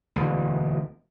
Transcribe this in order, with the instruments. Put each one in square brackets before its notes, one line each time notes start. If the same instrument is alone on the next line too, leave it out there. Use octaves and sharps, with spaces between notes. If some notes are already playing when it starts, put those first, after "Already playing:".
[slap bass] E1 D2